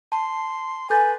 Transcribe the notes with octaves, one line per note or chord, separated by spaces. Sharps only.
A5 C6
A4 B4 G#5 G6 A6